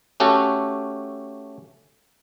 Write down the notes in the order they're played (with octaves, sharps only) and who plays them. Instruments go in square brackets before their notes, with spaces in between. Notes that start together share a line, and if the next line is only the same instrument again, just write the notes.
[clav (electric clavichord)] A3 C#4 F#4 G4 A4